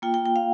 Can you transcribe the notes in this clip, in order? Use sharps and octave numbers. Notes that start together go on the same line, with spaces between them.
A#3 F4 G5
G5
G5
F5